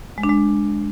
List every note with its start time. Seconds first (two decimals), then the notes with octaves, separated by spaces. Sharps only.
0.18 G#3
0.23 D4
0.29 G#3